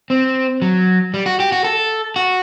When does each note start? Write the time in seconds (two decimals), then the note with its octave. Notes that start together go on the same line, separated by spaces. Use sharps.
0.10 C4
0.62 F#3
1.14 G3
1.26 F#4
1.40 G4
1.52 F#4
1.64 A4
2.16 F#4